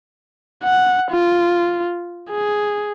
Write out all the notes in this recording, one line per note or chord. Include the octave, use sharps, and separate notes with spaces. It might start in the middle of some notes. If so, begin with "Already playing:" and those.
F#5
F4
G#4